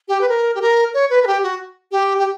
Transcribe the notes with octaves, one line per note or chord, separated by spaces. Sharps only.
G4
B4
A#4
G4
A#4
C#5
B4
A#4
G4
F#4
G4
G4